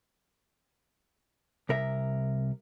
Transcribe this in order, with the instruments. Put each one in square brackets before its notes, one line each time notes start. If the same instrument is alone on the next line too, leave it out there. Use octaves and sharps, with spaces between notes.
[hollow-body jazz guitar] C2 A#4 E5